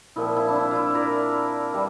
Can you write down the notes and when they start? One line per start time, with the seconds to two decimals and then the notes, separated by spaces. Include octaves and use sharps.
0.16 A#2 F3 C4 E4
0.36 E4
0.49 D4
0.55 E4
0.71 E4 F4
0.95 A#4 D5
1.73 E3 G3